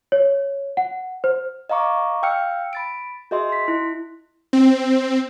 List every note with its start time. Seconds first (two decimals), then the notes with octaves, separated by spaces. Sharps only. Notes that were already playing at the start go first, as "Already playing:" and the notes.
0.12 C#5
0.77 F#5
1.24 C5
1.70 D#5 F5 A#5 C#6 D6
2.23 F5 G5 E6 F6 C#7
2.73 B5 A6 D7
3.31 F#4 G#4 D#5 E5 C6
3.49 C6 B6
3.68 E4
4.53 C4